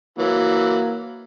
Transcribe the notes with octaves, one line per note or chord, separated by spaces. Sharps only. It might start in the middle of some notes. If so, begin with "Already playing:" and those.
E3 F#3 A#3